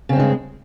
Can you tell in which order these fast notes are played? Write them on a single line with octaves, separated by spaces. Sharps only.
C#3 C4 G2 G#3